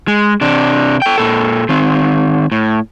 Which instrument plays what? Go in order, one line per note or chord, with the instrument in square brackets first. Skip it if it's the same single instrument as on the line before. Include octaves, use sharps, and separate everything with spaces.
[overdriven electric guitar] G#3
C3 D4
A4 G5
A#2 A4
D#3 C4
A2